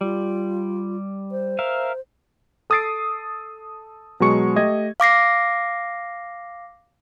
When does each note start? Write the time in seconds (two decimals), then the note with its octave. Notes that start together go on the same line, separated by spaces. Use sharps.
0.01 G3 F4
1.31 C5
1.59 A#4 E5 F5
2.70 A4 D#6 E6 A6 C7 D7
4.20 B2 F#3 G#3 C#6 C#7
4.56 A3 G4 D#5 G#6
5.00 F5 D6 A#6 C7